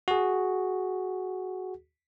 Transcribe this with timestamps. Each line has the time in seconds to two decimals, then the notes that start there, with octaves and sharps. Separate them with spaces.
0.08 F#4 G#4